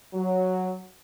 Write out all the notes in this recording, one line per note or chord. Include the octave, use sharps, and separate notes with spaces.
F#3